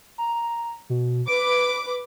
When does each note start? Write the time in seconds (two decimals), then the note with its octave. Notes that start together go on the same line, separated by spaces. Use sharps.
0.18 A#5
0.90 B2
1.28 B4 D6 D7